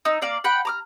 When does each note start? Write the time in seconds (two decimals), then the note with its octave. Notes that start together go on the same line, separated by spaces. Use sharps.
0.05 D#4 E6
0.22 A#3 D5 F5
0.44 F#5 G5 B5
0.65 A#5 D6 F6